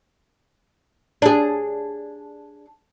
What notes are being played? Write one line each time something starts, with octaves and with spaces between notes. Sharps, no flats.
D4 G#4